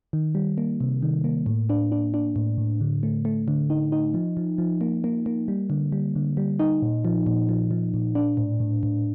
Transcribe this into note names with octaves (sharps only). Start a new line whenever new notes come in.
D#3
G3
A#3
C3
D#3
A#3
A2
D4
D4
D4
A2
A2
D3
A3
A3
D3
D#4
D#4
F3
F3
F3
A#3
A#3
A#3
G3
D3
G3
D3
G3
D#4
A#2
F3
A#2
F3
F3
A#2
D4
A2
A2
A2